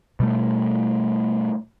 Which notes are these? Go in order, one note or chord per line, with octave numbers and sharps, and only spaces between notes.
B2 G3 A3